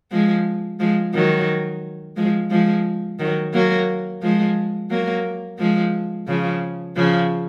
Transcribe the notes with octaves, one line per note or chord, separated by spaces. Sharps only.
F3 G#3
F3 G#3
D#3 F#3
F3 G#3
F3 G#3
D#3 F#3
F#3 A#3
F3 G#3
F#3 A#3
F3 G#3
C#3 F3
C#3 F3